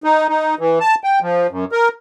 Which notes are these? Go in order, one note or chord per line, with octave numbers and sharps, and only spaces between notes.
D#4
D#4
E3
A5
G5
F3
F#2
A#4